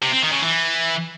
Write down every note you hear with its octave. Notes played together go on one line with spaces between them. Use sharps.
C3
C4
D#3
C#3
E3